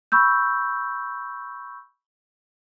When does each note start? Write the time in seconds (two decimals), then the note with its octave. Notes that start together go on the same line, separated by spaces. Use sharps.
0.12 B5 C#6 E6 G6